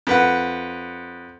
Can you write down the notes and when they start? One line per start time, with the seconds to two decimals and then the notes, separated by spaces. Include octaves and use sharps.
0.07 F2 B4 F#5